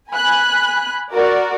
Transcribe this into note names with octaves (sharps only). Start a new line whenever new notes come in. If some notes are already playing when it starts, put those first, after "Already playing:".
G#5 B5 F#6
F#4 A#4 D5